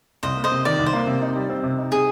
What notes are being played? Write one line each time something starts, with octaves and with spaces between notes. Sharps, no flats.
C2 C5 D#5
A#3
C5 D#5
C3
D#3 D5
C2
C5
A#3
C3
D#4
G3
C4
C3
D#4
C3 G#4